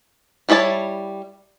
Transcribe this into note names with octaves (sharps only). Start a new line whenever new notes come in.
G3 E4 C#5 D#5 A5